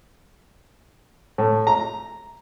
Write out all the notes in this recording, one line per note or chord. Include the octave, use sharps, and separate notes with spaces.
A2
A#5